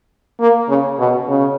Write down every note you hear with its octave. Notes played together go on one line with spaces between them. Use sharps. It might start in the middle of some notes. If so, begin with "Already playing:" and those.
A#3
C#3
B2
C#3